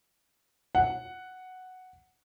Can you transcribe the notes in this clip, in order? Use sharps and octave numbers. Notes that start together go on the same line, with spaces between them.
F#5